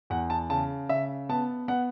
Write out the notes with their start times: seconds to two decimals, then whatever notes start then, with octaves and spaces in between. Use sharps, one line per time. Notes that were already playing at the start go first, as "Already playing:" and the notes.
0.10 E2 F#5
0.30 A5
0.50 C#3 A5
0.89 C#3 E5
1.29 B3 A5
1.68 B3 F#5